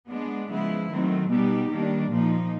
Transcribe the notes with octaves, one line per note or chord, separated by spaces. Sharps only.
G#3 B3 D4
C#3 F3 G#3 B3 E4
D#3 F#3 A3 C4
B2 G3 B3 D#4 G4
D#3 G3 A#3 D4
A#2 F3 A#3 D#4